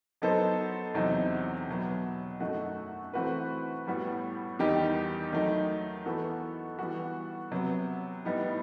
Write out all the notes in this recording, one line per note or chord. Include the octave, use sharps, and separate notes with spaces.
F#3 B3 D#4 A4 C5
E2 C3 F#3 C4 D#4
B2 F#3 B3
F#2 D#3 A3 D#4 F#4
E3 A3 C4 F#4 B4
A2 G3 B3 F#4
E2 D#3 G3 D#4 G4
D#3 F#3 A3 D#4
E3 B3 F#4 A4
E3 G3 B3 F#4
C3 F#3 B3
A2 G3 B3 D#4